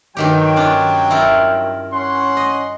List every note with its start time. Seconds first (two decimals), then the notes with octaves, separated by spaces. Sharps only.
0.17 G2 D#3 F#3 G4 G5
0.56 C#4 D4 F4
1.10 E4 F4 A#4
1.93 C#4 F#5 C6
2.37 D#5